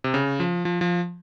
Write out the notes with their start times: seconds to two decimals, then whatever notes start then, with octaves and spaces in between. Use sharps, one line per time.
0.04 C3
0.14 C#3
0.40 F3
0.65 F3
0.81 F3